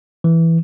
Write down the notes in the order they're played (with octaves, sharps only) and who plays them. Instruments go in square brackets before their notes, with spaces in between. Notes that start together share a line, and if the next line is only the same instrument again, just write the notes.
[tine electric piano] E3